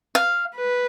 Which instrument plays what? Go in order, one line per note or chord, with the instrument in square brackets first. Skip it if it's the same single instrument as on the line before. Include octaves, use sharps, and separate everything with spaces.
[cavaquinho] F5
[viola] B4